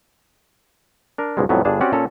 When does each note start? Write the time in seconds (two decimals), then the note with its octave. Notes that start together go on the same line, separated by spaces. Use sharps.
1.18 D4 A#4
1.37 C#2 G#2 B2 G3 G#3
1.49 F2 A2 F#3 G3 B3
1.65 G1 G2 D4 G#4 D5 A5
1.81 C4 C#4 F#4 G4 D5 F#5
1.92 A#2 C#4 A4 A#5